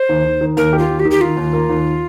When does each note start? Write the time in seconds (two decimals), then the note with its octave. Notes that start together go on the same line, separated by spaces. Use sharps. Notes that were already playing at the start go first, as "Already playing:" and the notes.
Already playing: C5
0.09 D#2
0.25 D#2
0.41 D#3
0.57 D#2 A#4
0.73 G4
0.79 F4
0.89 D#2
1.00 G4
1.05 D#3
1.11 G4
1.21 D#3 F4
1.37 D#2
1.53 A#3
1.69 D#2